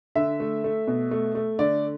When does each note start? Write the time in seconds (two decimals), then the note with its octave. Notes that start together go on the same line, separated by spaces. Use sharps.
0.15 D3 E5
0.40 A3
0.64 A3
0.87 B2
1.11 A3
1.35 A3
1.59 D3 D5